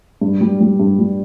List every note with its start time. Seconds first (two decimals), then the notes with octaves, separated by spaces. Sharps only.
0.21 G2
0.41 G3
0.60 G3
0.80 G2
0.99 G3